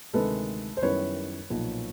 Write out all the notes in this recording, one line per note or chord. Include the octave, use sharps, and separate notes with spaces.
D2 C3 D#3 G#3 A4 B4
C5
F#2 D#3 G3 B3 E4 B4 C#5
B1 A#2 F3